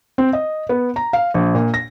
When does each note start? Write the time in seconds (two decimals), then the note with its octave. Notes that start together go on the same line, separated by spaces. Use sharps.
0.18 C4
0.33 D#5
0.69 B3
0.96 A#5
1.13 F5
1.34 A#1
1.55 A#2
1.74 A#6